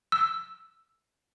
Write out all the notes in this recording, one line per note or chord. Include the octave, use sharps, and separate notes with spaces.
E6